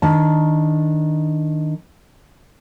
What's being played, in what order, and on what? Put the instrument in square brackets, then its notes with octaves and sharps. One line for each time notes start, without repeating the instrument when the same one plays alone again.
[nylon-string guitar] D#3 D4 A5